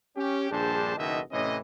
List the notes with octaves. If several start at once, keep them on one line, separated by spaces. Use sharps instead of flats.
C#4 G4
A#1 G2 D4 G#4 C5 A5
F#1 B1 B2 D#3 D#5 E5
A2 C3 E3 C#4 D#5